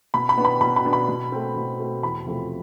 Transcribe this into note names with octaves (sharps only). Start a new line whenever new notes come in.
B2 B5
B5
B3 D4
B5
B2 B5
B5
B3 D4
B5
B2
A3 C4
B2
A3 C4
E2 B5
C3 F3 A3 C4